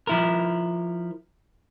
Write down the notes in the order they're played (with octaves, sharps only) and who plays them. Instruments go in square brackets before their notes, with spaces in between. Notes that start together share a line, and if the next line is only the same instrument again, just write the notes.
[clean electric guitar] F3 E4 A#4